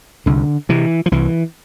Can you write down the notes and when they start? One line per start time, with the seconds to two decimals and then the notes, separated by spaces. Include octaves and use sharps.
0.26 C2 D3
0.69 C3 E3
1.06 F3
1.11 C2 E3